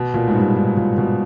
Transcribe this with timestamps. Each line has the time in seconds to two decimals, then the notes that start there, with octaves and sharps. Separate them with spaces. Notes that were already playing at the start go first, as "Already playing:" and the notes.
Already playing: B2
0.14 A#2
0.28 G#2
0.35 G2
0.56 G#2
0.77 A#2
0.98 B2